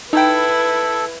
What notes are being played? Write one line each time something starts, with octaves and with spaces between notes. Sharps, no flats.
D#4 E4 A4 B4 G5